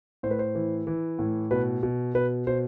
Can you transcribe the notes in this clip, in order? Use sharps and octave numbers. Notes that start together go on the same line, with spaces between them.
A2 C5
B4
C5
E3
E3
A2
B2 B4
B2
B2 B4
B2 C5